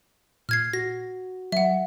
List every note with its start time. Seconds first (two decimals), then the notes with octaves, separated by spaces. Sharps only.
0.49 A#2 F6 G#6 C7
0.73 F#4 A#6
1.52 F#3 E5 F#5